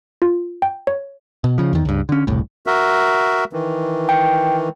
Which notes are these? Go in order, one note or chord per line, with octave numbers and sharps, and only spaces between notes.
F4
G5
C#5
B2
C#3 F3
E2 D#3
C#2 G2
D3 C#4
E1 C2 A2
F#4 A#4 E5
D#3 E3
G5